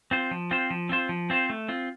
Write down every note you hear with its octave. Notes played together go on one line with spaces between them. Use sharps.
C4 F4 C5
F3
C4 F4 C5
F3
C4 F4 C5
F3
C4 F4 C5
A3
C4 F4